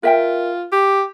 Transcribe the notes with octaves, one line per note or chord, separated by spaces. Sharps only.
F4 A#4 E5 G5
G4